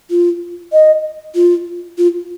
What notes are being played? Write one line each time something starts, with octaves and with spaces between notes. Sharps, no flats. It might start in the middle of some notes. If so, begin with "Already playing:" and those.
F4
D#5
F4
F4